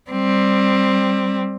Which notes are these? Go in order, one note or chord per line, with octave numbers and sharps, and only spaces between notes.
G3 C4